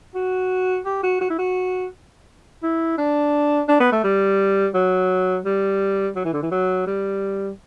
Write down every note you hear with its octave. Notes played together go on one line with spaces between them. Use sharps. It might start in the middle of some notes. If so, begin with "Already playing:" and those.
F#4
G4
F#4
F#4
E4
F#4
E4
D4
D4
B3
A3
G3
F#3
G3
F#3
E3
D3
E3
F#3
G3